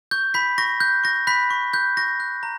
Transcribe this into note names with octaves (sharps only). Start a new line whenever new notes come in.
C#6 G6
B5 G6 B6
C#6 A#6
F#6 G6
C#6 A#6
B5 F#6 B6
C#6
F#6 G6
C#6 A#6
F#6
A#5